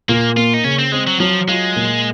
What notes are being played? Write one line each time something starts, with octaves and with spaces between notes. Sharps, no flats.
A#2 A#3
A#3 F4
D#4
C#3 C#4
C4
G#3 C4
F#3
F3 F#3
G#3 F4
A#2